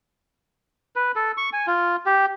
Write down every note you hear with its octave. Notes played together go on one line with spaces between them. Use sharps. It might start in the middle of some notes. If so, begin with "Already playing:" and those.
B4
A4
C#6
G#5
F4
G4